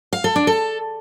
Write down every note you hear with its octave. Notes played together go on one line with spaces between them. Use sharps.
F5
A4
D4
A4